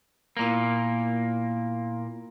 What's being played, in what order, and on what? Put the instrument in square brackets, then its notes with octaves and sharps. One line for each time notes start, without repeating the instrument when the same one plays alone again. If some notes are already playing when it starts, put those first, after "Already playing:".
[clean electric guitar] A#2 A#3 [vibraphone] B3 E4 F5